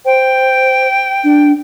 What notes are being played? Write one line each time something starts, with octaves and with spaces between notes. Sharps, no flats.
C5 G5
D4